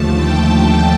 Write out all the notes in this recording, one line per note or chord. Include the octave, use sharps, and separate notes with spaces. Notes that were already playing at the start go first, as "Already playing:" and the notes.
Already playing: D#2 D3 F3 A3 A5
G5
A5